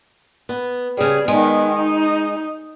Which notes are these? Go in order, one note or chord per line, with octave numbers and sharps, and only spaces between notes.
B3
C#3 G3 G#4
D#3 G#3 B3
D#4